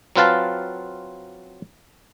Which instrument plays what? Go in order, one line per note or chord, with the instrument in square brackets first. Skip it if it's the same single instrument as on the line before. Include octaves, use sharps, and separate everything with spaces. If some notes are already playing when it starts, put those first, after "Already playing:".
[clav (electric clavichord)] F#3 C4 F4 B4 F5 A5